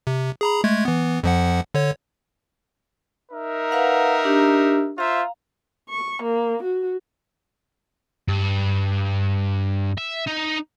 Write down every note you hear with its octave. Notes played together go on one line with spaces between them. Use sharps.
C3
G#4 A#5 B5
G#3 A3 G#6
E3 B3
F2 F3 F#5
D3 C#5
D#4 A#4 E5
B4 F5 F#5
D4 G4
F4 C5 E5 F5 A#5
C#6
A#3
F#4
G2
E5
D#4